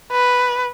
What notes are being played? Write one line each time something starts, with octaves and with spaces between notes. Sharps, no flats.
B4